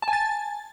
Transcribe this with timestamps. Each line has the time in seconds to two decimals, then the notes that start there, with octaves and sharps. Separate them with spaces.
0.02 A5
0.08 G#5
0.13 A6